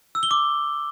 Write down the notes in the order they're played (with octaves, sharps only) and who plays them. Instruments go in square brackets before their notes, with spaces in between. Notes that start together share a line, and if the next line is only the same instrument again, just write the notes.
[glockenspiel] E6
G7
D6